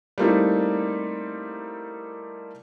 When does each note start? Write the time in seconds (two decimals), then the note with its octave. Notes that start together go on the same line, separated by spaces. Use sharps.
0.18 G3 A3 A#3 C4 D#4 E4